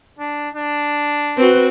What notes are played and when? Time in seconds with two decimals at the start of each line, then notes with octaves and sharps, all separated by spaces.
0.19 D4
0.55 D4
1.37 C4 F#4 B4